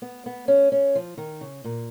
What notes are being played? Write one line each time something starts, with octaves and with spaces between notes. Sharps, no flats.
B3
B3
C#4
C#4
F3
D#3
C#3
A#2